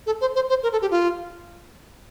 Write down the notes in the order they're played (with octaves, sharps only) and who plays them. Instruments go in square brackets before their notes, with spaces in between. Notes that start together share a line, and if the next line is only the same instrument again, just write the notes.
[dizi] A4
C5
C5
C5
A#4
A4
G4
F4